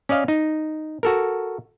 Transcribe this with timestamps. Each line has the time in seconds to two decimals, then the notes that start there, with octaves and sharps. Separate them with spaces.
0.09 C#4 D5 D#5 F5
0.28 D#4
1.03 F#4 A4 A#4